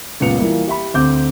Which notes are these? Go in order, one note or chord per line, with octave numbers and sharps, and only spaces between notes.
C#2 F#2 A#2 B3 C#7 F7
E3 G3 A#3 E4 F4
G4 E5 B5
D2 C4 D6 G6